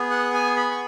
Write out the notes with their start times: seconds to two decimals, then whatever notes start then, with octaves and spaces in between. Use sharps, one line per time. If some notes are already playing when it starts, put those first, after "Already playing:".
Already playing: B3 G#4
0.10 F#5
0.34 G#5
0.57 B5
0.71 C#6